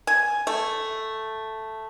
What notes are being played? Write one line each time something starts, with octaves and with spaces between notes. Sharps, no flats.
G#5
A3